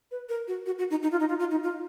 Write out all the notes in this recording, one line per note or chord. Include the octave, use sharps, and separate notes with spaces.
B4
A#4
F#4
F#4
F#4
D#4
D#4
F4
D#4
F4
F4
D#4
F4